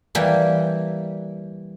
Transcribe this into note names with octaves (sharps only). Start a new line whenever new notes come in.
E3 G3 A#3